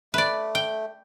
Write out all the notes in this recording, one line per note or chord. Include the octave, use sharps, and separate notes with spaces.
A3 B4 D5
G5